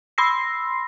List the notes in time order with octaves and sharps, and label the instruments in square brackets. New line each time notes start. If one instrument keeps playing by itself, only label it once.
[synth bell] B5 C6 E6 A#6 C7